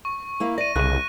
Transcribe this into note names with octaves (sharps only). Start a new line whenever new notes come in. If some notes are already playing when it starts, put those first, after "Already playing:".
C#6
A#3 E4 F5
D5 A#6 D#7
C2 C#3 F#6 D#7